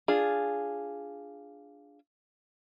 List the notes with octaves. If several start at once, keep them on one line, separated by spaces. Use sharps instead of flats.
D4 F4 G#4